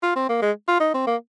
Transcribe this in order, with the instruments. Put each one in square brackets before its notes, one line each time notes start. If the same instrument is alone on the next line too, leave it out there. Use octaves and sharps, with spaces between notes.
[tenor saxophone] F4
C4
A#3
G#3
F4
D#4
C4
A#3